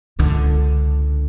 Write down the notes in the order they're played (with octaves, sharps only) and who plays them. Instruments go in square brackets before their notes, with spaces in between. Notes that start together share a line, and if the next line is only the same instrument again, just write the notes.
[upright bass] C#2 D3